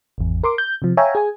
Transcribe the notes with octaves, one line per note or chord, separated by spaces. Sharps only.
G#1 E2
A#4 C6 D6
G6
C3 F3
C#5 E5 F5 G5 G#5 A#5
G#4 G#5